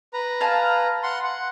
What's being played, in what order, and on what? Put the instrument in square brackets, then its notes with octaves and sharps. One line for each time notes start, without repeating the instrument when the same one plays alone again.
[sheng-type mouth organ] B4 A#5
[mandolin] F5 G#5 A5
[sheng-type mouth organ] F#5 C6
F#5